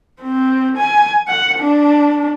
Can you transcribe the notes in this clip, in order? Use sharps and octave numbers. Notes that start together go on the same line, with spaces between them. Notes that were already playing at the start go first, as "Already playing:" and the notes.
C4
G#5
F#5
D4